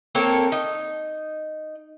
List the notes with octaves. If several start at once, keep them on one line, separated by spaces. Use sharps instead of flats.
A#3 C4 A4 C#5
D#4